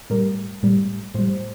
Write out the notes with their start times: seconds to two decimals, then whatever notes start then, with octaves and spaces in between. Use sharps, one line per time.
0.10 A2 G3 A#4
0.63 A2 G3
1.14 A2 G3 C5